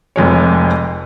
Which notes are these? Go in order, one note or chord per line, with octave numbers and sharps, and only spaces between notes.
F1 F2 G#3 C#5